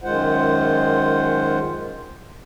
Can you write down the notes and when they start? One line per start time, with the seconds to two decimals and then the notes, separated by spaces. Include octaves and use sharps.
0.04 F#2 D#3 G#3 F4 C5 F#5